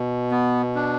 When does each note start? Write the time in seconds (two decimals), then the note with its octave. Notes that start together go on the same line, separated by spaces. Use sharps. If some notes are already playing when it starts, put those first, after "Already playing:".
Already playing: B2
0.31 B3
0.75 D4